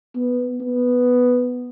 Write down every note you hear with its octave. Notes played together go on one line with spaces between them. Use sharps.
B3
B3